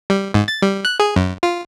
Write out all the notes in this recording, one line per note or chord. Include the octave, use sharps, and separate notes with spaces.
G3
G#2
A6
G3
F#6
G#4
F#2
F4